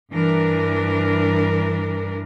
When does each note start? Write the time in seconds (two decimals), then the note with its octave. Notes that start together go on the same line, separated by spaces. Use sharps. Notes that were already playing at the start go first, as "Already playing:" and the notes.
0.13 G2 E3 D4 A#4